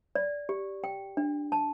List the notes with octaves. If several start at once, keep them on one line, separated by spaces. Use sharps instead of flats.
D5
G4
G5
D4
A5